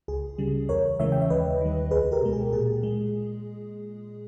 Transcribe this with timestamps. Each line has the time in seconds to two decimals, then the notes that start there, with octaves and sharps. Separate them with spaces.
0.08 C#2 G#4
0.38 C#3 G3
0.69 E2 A#4 C#5
0.99 C#3 E3 G#3 C#5 E5
1.12 G5
1.21 E5
1.30 D#2 B4 D#5
1.61 D#3 G3
1.91 C#2 G#4 B4
2.12 G4 A#4
2.22 B2 G#3
2.33 G#4
2.53 A#2 G#4
2.83 G#3